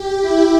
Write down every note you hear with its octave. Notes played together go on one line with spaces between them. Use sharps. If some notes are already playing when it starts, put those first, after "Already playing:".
Already playing: G4
E4